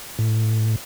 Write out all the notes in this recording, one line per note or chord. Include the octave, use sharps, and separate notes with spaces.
A2